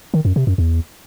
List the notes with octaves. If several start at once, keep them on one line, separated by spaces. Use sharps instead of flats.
D#3
F#2
C3
F#2
E2